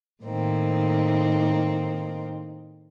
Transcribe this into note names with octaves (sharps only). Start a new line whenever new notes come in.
A2 D#3 A#3 C4 D#4